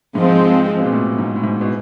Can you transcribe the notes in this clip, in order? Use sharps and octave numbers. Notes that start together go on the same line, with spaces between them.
G#2 F3 G#3 C4
B2
A#2
A2
G#2
A2
G#2
B2